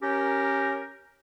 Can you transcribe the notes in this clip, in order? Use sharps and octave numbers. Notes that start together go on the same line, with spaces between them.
C#4 G4 A#4